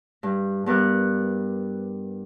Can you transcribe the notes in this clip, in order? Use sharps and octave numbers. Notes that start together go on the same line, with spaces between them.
G2
G2 B3 A#4 D5 F#6